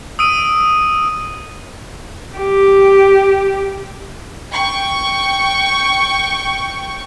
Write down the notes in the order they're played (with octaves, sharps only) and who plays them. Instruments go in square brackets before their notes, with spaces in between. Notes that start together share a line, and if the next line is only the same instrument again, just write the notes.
[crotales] D#6 E6 D7 D#7
[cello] G4
[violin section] G5 C#6